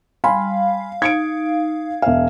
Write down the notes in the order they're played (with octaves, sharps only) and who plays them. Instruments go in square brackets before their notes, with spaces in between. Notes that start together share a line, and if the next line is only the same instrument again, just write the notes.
[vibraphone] G3 [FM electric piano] F5 [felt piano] G#5 B5 C6
[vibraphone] D#4 [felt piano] G#6 C#7 D7
[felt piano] E1 F5 [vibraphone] E5